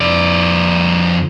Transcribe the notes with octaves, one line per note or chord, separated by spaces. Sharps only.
F2 D5